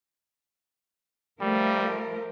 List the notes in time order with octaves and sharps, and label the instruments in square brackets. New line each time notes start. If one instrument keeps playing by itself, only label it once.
[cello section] F3 A3 A#4 [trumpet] G3